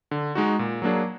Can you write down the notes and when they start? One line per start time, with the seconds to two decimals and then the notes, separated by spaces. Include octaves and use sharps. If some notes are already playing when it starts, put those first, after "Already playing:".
0.11 D3
0.35 G#3 D#4 F#4
0.59 A#2
0.82 F#3 A#3 D4 G#4